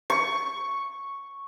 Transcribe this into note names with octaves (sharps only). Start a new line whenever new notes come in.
C#6